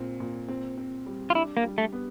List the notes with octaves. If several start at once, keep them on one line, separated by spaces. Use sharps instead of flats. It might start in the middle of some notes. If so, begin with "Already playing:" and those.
Already playing: A#2 C4
A#2
C4
C4
G3
F4
D4 E4
A#3
G3
A3
B3